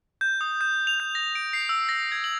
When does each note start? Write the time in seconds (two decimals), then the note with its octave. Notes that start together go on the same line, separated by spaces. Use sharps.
0.21 G6
0.41 D#6
0.61 G6
0.87 F7
1.00 G6
1.15 A#6
1.35 D7
1.53 C7
1.69 E6
1.89 A#6
2.12 G#6
2.24 F#7